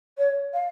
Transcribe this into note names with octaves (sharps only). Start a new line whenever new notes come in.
C#5
F5